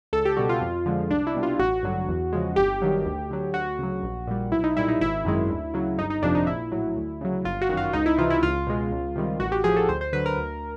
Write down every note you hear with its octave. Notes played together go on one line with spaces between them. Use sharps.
C#2 A4
G4
B2 G3 F#4
F4
F2
D3 F3 G#3
C2 D4
E4
B2 G3
F4
A1 F#4
G2 D3 F#3
E2
C#3 F3 G#3
G1 G4
G2 D#3 F#3
D2
D3 F#3
D2 F#4
C#3 F#3
A#1
A#2 G3
B1 E4
D#4
A#2 G3 E4
D#4
G#1 E4
F#2 D#3 G#3
D2
C#3 F#3
G1 D#4
D#4
F2 C3 F3 D4
D#4
A#1 E4
A2 F#3
D2
C#3 F#3
G1 F4
F#4
F#2 D#3
F4
C#2 D#4
E4
C3 E3 F4
E4
C#2 F4
B2 G#3
C#2
C3 D#3 G3
A1 F#4
G4
A2 F3 G#4
A4
D2 C5
C5
D3 F#3 B4
A#4
D2